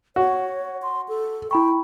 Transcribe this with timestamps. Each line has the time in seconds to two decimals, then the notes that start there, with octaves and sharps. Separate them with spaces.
0.16 F#4 C#5
0.82 C6
1.09 A4
1.51 E4 G5 B5 C#6